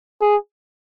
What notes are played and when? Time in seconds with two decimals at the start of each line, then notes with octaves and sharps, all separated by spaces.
0.22 G#4